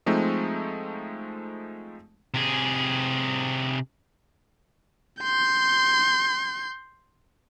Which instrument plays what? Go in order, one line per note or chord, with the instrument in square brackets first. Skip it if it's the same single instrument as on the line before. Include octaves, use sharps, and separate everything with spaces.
[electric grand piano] F3 G#3 A3 C4 D#4
[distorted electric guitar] C3 G#4
[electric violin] C6 G6